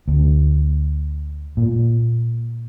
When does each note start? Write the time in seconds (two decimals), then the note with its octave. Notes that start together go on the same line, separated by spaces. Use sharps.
0.08 D2
1.57 A#2